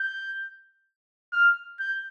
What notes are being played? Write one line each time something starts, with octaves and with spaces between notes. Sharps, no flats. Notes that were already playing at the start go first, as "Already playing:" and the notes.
Already playing: G6
F6
G6